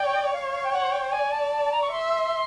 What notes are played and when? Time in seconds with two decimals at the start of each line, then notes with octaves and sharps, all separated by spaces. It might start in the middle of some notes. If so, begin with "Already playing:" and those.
Already playing: D5 G5
0.33 C#5 F5
0.52 F5
0.64 G5
0.73 F#5
0.92 G5
1.12 D5 G#5
1.32 A5
1.52 A5
1.65 A5
1.72 A#5
1.82 C#6
1.91 E5 C6